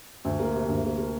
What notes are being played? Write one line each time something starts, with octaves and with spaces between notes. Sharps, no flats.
D2
A#3
C3
D2
A#3
A#3